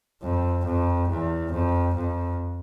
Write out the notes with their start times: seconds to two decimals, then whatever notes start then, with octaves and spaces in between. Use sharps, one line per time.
0.22 F2
0.65 F2
1.09 E2
1.52 F2
1.95 F2